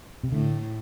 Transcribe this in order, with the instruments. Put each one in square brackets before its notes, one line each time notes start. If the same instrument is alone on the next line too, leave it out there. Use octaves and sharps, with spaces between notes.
[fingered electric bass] C3
[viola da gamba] A2 A3 [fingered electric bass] D3